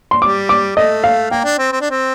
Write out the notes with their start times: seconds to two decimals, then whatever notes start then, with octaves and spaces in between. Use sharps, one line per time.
0.11 C6
0.22 G3 D6
0.49 D6
0.76 A3 D#5
1.04 F5
1.31 A#3 G5
1.44 D4
1.58 C4
1.72 C4
1.81 D4
1.91 C4